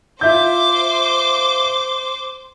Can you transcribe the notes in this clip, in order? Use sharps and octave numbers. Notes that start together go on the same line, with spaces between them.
F4 C5 E5 D6 G6